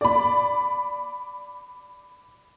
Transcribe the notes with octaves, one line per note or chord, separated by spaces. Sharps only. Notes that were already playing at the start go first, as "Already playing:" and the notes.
D5 B5